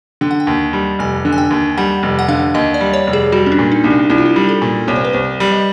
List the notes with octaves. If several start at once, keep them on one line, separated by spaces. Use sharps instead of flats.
D3 G5
F#5
G5
D#2
G3
F1 G#5
D3
G#5
G5
D#2
G3 F#5
F1
F#5
D3 F5
D#2 D#5
D5
G3
C#5
F1
G#4
G3 F#4
C#4
D4
A#2
D#4
C2
D4
C2 E4
F4
E4
G3
A4
A#2
C2 C#5
C5
B4
C2 C5
G3
D#5